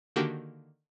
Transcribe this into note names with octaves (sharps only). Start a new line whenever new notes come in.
D3 D#3 A#3 D4 F#4 G4